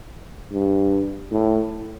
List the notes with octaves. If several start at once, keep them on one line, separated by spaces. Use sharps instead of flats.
G2
A2